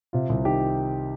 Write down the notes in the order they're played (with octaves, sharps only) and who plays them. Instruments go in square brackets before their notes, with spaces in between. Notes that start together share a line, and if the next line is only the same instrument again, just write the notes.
[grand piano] C3 F4
C2
D#3 G4